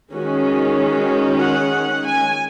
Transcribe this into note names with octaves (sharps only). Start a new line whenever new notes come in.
D#3 G#3 C#4 F#4
F#4
F#5
G#5